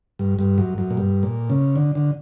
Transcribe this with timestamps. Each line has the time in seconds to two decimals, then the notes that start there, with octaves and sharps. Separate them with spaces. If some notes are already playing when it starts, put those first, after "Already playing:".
0.19 G2
0.39 G2
0.58 F#2
0.78 F#2
0.91 A#2
0.97 G2
1.23 A#2
1.50 C#3
1.76 D3
1.95 D3